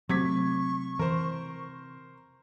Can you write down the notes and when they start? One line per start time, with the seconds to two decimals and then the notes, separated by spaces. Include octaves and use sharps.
0.09 C3 F#3 A3 C#6 D6 G#6 B6
0.99 E3 A#4 C5